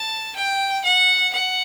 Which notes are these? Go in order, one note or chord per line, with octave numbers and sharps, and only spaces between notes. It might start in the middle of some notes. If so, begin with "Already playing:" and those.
Already playing: A5
G5
F#5
F#5